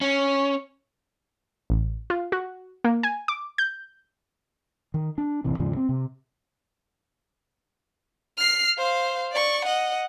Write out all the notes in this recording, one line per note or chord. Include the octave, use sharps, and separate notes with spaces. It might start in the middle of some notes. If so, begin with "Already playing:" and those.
C#4
A1
F4
F#4
A#3
G#5
D6
G6
D#3
D4
E1 A1 C3 E3
D#2 G#2 C#3 F3
C4
C3
F6 C7
C5 F5
D5 C#6
D#5 F#5